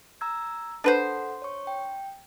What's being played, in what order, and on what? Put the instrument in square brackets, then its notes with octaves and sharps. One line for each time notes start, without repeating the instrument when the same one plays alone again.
[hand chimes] A#5 E6 G#6
[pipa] D4 B4 C5 [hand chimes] A4 F#5
[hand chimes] C#5 C#6
G5